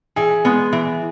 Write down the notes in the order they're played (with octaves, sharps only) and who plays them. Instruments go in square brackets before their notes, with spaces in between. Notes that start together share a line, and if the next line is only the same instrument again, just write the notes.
[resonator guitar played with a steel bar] E3 [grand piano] G#4
[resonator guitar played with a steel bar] G#3 B3
E3